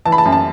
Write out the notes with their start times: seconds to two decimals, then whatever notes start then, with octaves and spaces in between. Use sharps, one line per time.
0.06 E3 A5
0.12 B5
0.18 A5
0.25 F#2
0.32 A5